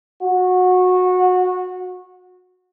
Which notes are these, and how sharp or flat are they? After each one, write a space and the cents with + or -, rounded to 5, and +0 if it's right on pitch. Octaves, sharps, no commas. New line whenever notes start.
F#4 -20